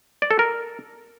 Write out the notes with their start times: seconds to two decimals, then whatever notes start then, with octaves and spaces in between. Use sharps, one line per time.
0.22 D5
0.31 A4
0.39 A#4